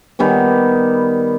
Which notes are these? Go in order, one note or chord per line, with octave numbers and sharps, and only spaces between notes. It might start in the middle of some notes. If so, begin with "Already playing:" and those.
D#3 G3 B3